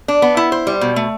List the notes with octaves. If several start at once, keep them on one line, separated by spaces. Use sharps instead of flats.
D4
B3
E4
C5
G3
B2
A3